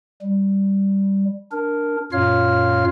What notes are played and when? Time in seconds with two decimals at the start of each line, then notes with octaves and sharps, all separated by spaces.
0.22 G3
1.52 D4 A#4
2.12 F#2 A#2 F4 C#5 F5 F6